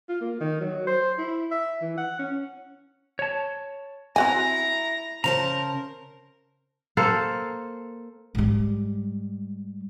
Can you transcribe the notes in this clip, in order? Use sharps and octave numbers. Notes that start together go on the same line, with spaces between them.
F4
A#3
D#3
F#3
C5
E4
E5
E3
F#5
C#4
C#5 A5
C4 E4 F#4 G#5 A#5
C#3 A#4 C5 A5 A#5
A#3 A4 C5
G#2 G3